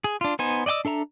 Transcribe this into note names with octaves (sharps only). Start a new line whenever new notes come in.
G#4
D4 F4
B3 D#4 C5 G#5
D5 D#5 G5 D6 E6
D4 A4 E5 A#5